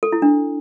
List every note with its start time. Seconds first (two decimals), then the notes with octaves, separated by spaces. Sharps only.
0.03 A4
0.12 E4
0.22 D4